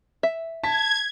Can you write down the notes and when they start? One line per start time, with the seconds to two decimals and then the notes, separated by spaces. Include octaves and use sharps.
0.23 E5
0.64 A5 G#6 B6